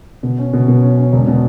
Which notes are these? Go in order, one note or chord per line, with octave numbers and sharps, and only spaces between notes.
B2
C#4
B2
B2
C#4
C#4
E1
B2